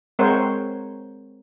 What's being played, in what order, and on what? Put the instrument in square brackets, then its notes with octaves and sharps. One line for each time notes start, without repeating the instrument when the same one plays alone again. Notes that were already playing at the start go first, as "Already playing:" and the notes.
[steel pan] G#3 C4 A#4 C5 C#5 F#5